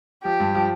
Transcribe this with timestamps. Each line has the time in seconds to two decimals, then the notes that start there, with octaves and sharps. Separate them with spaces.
0.24 F3 G4
0.40 G2
0.55 F3